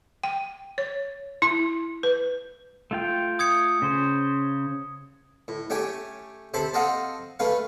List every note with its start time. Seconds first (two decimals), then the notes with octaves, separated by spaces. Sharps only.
0.23 G5
0.78 C#5
1.42 E4
2.03 B4
2.91 A3 F4 G5
3.39 D#6 G#6 C#7
3.82 C#3 C5
5.48 A2
5.70 A3 C#4 G4 G5 G#5
6.54 C3 A4 C5 A5 B5
6.74 C4 A4 D#5 F5 F#5
7.39 A3 C#4 B4 F5